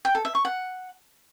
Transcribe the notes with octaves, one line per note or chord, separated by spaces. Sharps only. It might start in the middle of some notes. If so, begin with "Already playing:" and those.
G5
A4
E5
C#6
F#5